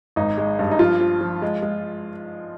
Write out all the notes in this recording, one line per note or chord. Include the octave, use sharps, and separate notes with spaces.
G#1 D#4
G#3
G2
D#4
F3 F4
F3
F3
G#3
G#3